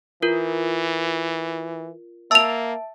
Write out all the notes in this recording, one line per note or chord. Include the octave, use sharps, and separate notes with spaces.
E3 F4 A#4
A#3 E5 A5 E6 F7